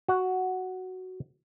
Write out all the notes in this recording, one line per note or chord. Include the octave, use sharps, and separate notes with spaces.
F#4 F#5